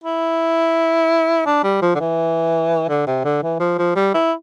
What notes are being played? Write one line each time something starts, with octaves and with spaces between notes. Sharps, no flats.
E4
D4
G3
F3
D3
E3
D3
C3
D3
E3
F3
F3
G3
E4